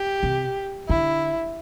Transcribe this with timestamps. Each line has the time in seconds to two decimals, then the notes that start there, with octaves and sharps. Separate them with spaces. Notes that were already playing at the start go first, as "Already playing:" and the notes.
Already playing: G4
0.23 C3
0.89 D3 E4